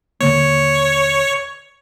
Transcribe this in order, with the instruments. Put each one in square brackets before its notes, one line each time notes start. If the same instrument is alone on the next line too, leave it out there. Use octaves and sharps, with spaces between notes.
[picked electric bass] D#1 D3 A#3 [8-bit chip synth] C#5